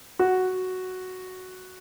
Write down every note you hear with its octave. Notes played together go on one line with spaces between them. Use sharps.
F#4